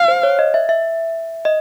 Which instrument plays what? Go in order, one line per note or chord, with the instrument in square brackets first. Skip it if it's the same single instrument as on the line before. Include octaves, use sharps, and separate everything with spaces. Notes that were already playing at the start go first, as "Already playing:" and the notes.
Already playing: [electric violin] F5
[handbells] C5
C#5
D#5
E5
E5
D#5